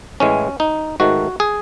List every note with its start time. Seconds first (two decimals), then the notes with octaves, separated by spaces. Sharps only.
0.20 A1 A2 E3 G#3 C#4
0.60 D#4
1.00 G#2 D#3 A3 F#4
1.40 G#4